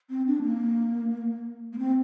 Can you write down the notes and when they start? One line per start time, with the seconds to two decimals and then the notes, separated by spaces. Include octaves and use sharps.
0.10 C4
0.27 D4
0.43 A#3
1.73 A#3
1.78 C4